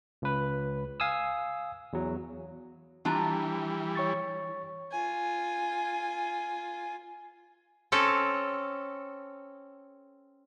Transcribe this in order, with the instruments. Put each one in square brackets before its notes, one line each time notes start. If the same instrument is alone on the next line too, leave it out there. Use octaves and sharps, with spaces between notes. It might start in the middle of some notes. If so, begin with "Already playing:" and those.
[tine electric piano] C#2 B4
F5 G#5 D#6 E6
E2 F#3
[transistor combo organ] E3 G3 [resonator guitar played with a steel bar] D4 F4 A#5
[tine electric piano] C#5 C#6 A6
[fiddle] F4 G#5
[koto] C4 C#4 A4